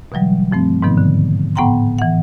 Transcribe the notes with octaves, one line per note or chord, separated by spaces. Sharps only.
B2 D3 E3 F#3 G3
G2 F3 A3 C4
G#2 B2 D#3 F3 B3 D#4
D3
A2 B3 F#5 G5 A#5 C6
E3 F#5